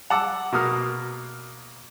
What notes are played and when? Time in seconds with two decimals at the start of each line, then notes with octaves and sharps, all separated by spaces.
0.10 F#5 A5 D6 E6
0.52 B2 A#3 D#6 F6